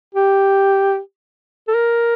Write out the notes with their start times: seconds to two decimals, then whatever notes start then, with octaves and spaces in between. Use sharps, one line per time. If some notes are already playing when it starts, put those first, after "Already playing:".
0.15 G4
1.68 A4
1.74 A#4